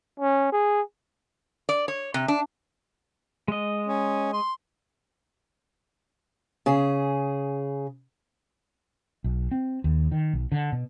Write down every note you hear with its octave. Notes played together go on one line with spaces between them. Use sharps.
C#4
G#4
D5
C#5
C3
D4
G#3 D#5
C#4
C6
C#3 G#4
B1
C4
D#2
D#3
B1
D3
B2